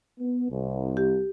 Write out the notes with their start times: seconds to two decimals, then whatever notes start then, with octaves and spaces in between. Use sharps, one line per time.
0.20 B3
0.50 C2
0.97 G4